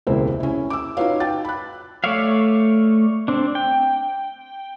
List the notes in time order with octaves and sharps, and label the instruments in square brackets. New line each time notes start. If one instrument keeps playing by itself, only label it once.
[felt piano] E1 C#2 C3 A#3 E4 C5
C#4 E4
D6 E6
D#4 F4 F#4 B4 C#5 F5
G5 A6
B5 F#6
[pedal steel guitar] A3 C#5 D5 E5 F5
C4 D4
G5